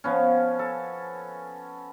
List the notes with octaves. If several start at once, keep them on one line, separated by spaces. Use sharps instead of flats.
F3 B3 C#4
A4